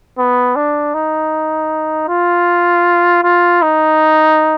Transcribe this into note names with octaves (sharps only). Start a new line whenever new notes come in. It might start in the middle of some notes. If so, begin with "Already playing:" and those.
B3
D4
D#4
F4
F4
D#4